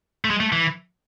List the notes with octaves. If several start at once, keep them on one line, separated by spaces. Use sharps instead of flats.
A3
G#3
A3
E3